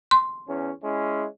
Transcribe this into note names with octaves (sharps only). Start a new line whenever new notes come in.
C6
E2 C#4
G#3 C#4 E4